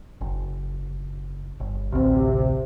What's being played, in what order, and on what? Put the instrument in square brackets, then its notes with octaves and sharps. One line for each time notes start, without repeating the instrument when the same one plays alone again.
[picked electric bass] F#1
G1
[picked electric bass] A1 D2 [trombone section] C3